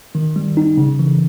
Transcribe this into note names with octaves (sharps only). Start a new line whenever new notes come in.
D#3
G3
D#4
C#3
E3